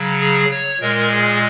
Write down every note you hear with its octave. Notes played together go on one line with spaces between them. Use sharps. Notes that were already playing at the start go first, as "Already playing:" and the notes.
Already playing: C#3 F#3
G#4
C#5
A#2 G#3 A#4
G#4